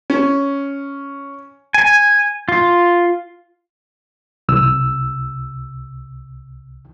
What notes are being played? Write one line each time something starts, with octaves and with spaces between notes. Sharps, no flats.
C#4
G#5
F4
C2 E6